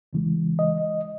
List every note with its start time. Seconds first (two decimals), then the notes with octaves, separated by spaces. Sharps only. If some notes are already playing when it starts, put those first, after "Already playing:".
0.13 E2 C#3 E3 G#3
0.59 D#5